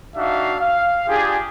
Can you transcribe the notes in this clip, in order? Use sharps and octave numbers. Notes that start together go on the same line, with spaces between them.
D4 D#4 F#4 E5 F5
F5
D4 F4 G4 G#4